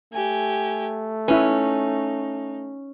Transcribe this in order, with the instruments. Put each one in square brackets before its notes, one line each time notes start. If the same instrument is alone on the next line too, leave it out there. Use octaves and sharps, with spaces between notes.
[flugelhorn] A3 [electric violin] G4 G#5
[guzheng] C#4 [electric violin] D#4 [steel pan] E4 B4